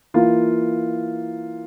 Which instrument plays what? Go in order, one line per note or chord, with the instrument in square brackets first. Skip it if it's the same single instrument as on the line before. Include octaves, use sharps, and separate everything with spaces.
[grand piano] E3 A#3 F4